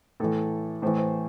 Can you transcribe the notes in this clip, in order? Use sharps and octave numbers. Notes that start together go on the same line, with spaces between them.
A2 E3 A4
A2 E3 C5
C5